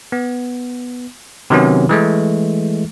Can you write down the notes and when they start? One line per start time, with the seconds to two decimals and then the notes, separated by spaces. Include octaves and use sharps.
0.12 B3
1.50 C3 D#3 F#3 B3 C#4
1.89 E3 G#3 A3